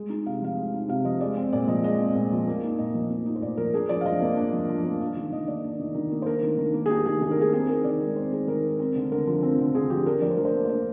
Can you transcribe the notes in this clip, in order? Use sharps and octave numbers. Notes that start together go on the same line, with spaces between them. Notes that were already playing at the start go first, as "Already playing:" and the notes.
Already playing: G#3
D#4
C3 F5
F3 F5
G#3
D#4
C3 F5
F3 D#5
G#3 D5
C4
A#2 D5
F3 D#5
G#3 D#5
C4
A#2
F3
A#3
D#4
A#2 D#5
F3
A#3
D#4
C5
A#2 D5
F3 A#4
D4 G#4
F3 D5
F5
F3 D#5
A#3
D4
F3
F3
A#3
D4
D#3
D#3 D#5
A#3 D5
D4
D#3
D#3
A#3
C5
D4 A#4
D#3
D#3
A#3
G#4
D4 G4
D#3 G#4
D#3 G#4
A#4
A#3 G#4
C4 G#4
D#4 A#4
D#3 D5
G#3
C4 C5
D#4 G#4
D#3 A#4
G#3
C4
D3
D3 A#4
F3
C4
D3
D3 G#4
F3 G4
D4 A#4
F3 D5
C5
F3 A#4
C5
A#3
C5
D4 D5